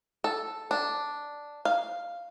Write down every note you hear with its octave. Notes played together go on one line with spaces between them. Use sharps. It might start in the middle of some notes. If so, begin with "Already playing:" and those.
A4
D4
F5